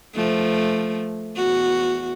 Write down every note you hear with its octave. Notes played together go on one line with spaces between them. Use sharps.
F3 A3
E2 F#4